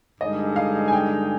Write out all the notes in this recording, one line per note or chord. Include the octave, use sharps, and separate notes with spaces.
G2 D3 G#3 D#4 G#4 D#5
F5
G#5
G5